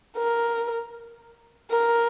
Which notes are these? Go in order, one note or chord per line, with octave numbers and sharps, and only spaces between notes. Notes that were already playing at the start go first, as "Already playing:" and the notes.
A#4
A#4